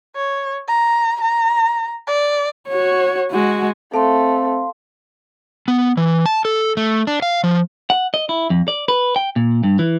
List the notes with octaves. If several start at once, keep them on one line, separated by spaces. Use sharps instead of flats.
C#5
A#5
A#5
D5
F#4 C#5
G#3 F#4
A3 C4 A4 F5 A5 C6
B3
E3
A5
A4
A3
D4
F5
F3
F#5
D#5
E4
F2
D5
B4
G5
A#2
G2
E3